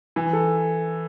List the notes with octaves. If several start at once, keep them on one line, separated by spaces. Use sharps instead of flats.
E3
A4